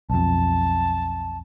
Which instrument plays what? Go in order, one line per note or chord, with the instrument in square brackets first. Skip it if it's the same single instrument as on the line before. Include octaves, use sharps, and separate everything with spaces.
[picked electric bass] B1 F2 [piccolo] A5